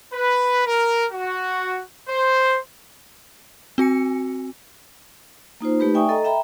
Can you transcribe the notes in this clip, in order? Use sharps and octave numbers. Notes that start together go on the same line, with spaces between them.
B4
A#4
F#4
C5
C4 F#4 G#5 C#7
A#3 D#4 F4 C5
A3 D#4 G4 B4 B5
D5 E5 G5 G#5 C#6 D#6
A4 D#5 A#5
E5 G5 A#5 B5